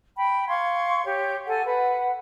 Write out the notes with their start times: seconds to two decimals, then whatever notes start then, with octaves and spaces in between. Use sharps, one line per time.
0.16 G5 B5
0.49 F5 C6 C#6 G#6
1.06 G4 C#5
1.46 A4 F#5 G#5
1.66 B4 F#5